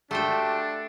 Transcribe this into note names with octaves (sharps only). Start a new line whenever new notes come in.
A3 D4 F#4 G4 A4 C5 G5